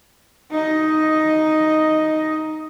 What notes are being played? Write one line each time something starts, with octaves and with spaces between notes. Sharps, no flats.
D#4 D#5